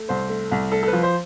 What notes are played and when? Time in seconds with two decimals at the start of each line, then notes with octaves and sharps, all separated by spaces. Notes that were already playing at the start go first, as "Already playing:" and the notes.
Already playing: A3
0.09 C2 C5
0.29 A3
0.51 C2
0.72 A3 A4
0.83 A4
0.87 B4
0.93 F3
1.03 C5